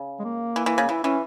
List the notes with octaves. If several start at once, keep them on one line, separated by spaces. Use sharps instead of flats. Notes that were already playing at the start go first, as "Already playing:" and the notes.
Already playing: C#3
G#3
A#3
E3
E3
C#3
E3 E4
E3 C#4